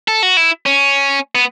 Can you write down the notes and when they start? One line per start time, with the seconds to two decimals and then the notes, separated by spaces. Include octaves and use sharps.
0.08 A4
0.23 F#4
0.37 E4
0.66 C#4
1.35 B3